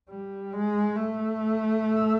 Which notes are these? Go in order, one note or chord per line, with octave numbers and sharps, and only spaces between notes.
G3
G#3
A3